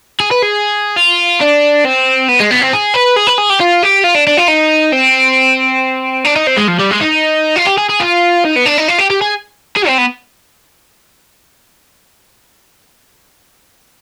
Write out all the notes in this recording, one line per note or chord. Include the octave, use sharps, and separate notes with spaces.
G#4
B4
G#4
F4
D4
C4
B3
G#3
B3
C4
G#4
B4
G#4
B4
G#4
G4
F4
G4
F4
D4
D4
F4
D#4
C4
D4
D#4
C4
G#3
F3
G3
G#3
D#4
F4
G4
G#4
G#4
F4
D#4
B3
D4
D#4
F4
G4
G4
G#4
G#4
C4
B3